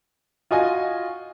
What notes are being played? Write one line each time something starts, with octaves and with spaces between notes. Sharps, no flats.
F4 F#4 D#5 G#5